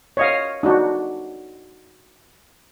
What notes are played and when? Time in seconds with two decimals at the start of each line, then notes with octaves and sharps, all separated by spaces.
0.17 C#5 D#5 F5
0.63 D4 D#4 F#4